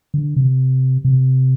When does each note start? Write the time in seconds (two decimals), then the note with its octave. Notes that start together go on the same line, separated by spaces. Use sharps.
0.14 D3
0.36 C3
1.05 C3